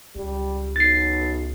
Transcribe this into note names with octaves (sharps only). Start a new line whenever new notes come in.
C#2 G3
B1 A6 C7